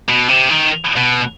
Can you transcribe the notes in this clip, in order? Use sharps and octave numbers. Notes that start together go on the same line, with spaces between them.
B2
C3
D#3
B2